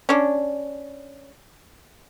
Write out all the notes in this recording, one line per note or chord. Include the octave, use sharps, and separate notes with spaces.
C#4 D4